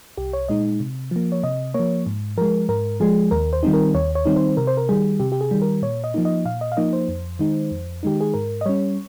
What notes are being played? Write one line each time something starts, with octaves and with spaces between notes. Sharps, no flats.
C2 G4
C#5
A#2 G#3 D#4 D#5
C3
F3 A#3
C#5
C3 D#5
F3 A#3 C#5
G#2
F3 G#3 A#4
G#2 A#4
F3 G#3 G#4
D#2 A#4
C5
D#3 G3 C4 D#4
A#4
D#2 C#5
C#5
D#3 G3 C4 D#4
C5
C3 A#4
C5
A#4
D#3 G3 G#4
C3 G4
G4
G#4
D#3 G3
A#4
A#2 C#5
D#5
F3 A#3 D#4
D#5
A#2 F5
D#5
F5
F3 A#3 D#4 D#5
C5
F2
D#3 G#3 D#4
F2
D#3 G#3 D#4 G4
G#4
G#2 A#4
D#5
G3 C#4 C#5